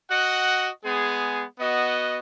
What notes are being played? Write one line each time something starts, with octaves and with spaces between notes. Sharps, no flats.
F#4 D#5 F#5
G#3 B3 G#4
B3 F#4 D#5 F#5